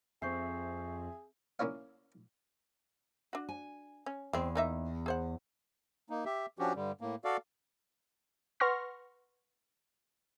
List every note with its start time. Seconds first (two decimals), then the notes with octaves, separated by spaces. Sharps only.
0.22 F2 C4 G#4 E5 C#6 G6 C7
1.59 A#3 C#4 E4 C#5 F5
3.33 D4 F#4
3.49 G#5
4.06 C#4
4.33 E2 G#3 C4
4.55 A#3 D#4 E5
5.06 G#4 C5 F#5
6.10 A#3 D#4
6.25 G4 E5
6.59 F3 C#4 D4 F#4 G4
6.75 G2 D3 G3
7.01 A2 A#3
7.25 F#4 A4 D5 F5
8.60 B4 F#5 C6 C#6 F6 A#6